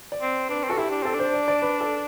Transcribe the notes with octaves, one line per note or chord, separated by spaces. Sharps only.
D5
C4
D4 B4
C4
F#4 A4
E4 G4
D4
C4 A4
D4 C5
D5
D5
B4
A4